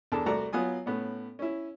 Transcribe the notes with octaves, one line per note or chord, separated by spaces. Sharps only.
E2 D4 A4 A#4 A5
C2 A3 F#4 D5 F#5 A#5
F#3 B3 F4 G#5 D#6
A2 B3 C#4
C#4 E4